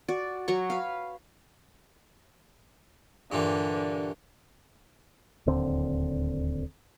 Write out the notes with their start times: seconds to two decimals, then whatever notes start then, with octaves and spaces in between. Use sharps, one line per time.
0.09 F#4 D5
0.48 F#3 F#4 A#5 C#6
0.70 B4 F5
3.32 G2 A#2 D3 E3
5.46 D1 D#2 D3 C4